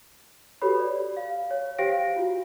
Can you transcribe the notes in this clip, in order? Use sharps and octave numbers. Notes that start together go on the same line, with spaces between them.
F#4 G4 A4 B4 C#5 B5
D5
F5
C#5
G4 C5 F5 G5 A#6 D7
F4 F#4